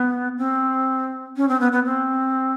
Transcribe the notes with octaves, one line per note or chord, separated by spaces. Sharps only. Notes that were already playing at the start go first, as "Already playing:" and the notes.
Already playing: B3
C4
C#4
C4
B3
B3
C4